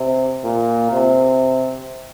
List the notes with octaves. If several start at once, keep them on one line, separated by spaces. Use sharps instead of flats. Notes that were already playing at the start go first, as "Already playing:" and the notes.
Already playing: C3
A#2
C3